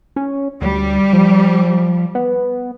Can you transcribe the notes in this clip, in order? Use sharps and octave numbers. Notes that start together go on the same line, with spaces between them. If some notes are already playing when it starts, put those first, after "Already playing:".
C#4
D2 G3
F3
B3